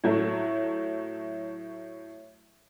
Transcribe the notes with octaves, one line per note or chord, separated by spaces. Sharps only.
A2 F#3 A3